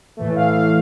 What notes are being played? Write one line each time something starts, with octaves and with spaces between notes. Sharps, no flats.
A2 E3 A3
F5
F5